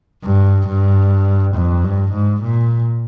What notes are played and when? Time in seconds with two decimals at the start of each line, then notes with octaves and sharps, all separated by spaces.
0.24 G2
0.67 G2
1.55 F2
1.84 G2
2.12 G#2
2.42 A#2